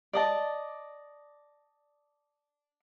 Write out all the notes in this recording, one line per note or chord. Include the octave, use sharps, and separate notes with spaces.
D5 D#5 A5